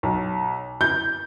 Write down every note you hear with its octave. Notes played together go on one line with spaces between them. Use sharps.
B1
G6